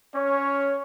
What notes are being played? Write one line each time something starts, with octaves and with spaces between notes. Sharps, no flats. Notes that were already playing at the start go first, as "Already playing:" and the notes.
C#4 C#5